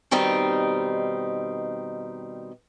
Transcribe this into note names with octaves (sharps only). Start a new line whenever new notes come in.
B2 D#3 G3 C4 D#4